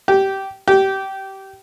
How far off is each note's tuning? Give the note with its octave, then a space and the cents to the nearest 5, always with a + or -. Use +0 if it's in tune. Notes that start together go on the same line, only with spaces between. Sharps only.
G4 -15
G4 -20